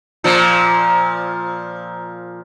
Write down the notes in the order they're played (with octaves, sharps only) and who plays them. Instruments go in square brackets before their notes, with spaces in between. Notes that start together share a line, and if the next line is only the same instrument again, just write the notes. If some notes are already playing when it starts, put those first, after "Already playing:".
[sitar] A#2 F3